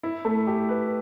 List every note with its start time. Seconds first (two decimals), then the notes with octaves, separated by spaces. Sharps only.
0.03 E4
0.25 A3
0.47 G4
0.69 B4